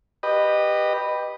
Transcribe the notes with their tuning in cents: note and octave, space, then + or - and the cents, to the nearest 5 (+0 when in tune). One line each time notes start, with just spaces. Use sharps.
G4 +0 B4 +0 D#5 -15